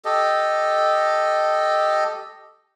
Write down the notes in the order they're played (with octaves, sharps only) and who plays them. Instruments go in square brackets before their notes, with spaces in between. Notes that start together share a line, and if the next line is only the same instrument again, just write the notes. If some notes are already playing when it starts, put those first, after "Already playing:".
[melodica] G4 A4 D#5